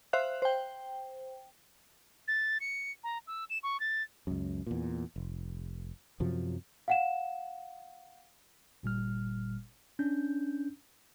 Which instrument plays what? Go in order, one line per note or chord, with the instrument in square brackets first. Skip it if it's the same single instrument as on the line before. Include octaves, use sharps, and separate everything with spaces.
[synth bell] C5 E5 F5 F#6
C5 G5
[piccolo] A6
C#7
A#5
E6
E7
C#6
A6
[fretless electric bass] C#2 F#2
E2 A#2
F1
F#2 C3 F3 F#3
[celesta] F5 F#5 E7
[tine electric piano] G1 A#2 G3 F6
C#4 D4 G6